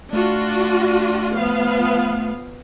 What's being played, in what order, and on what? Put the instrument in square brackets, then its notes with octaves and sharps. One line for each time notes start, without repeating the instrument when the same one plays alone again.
[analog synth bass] A3 [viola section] D4 F4 F#4
[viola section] F3 B3 F5